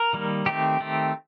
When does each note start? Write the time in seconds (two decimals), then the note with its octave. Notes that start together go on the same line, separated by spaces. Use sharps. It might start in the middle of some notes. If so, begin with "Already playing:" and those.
Already playing: A#4
0.13 D#3 G3 A#3
0.46 D#3 A3 C4 G4
0.80 D#3 A3 C4